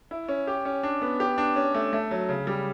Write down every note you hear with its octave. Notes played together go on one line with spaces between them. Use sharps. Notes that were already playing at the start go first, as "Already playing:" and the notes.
E4
C#4
G4
C#4
D4
B3
G4
D4
C#4
A3
A3
F#3
C#3
G3